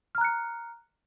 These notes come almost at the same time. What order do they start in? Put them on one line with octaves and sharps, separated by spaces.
F6 A#5 F#6 C#7